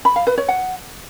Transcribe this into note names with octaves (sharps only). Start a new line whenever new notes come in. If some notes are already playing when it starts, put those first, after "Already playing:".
B5
F5
B4
C#5
F#5